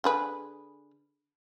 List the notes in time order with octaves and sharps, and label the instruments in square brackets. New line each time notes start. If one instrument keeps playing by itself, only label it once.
[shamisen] D3 G#4 B4